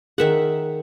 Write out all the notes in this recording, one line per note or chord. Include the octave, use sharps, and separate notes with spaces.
D#3 G#4 A#4 E5 F#5